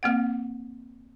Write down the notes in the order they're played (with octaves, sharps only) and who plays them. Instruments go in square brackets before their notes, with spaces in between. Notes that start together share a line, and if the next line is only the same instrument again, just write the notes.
[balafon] A#3 C4 F#5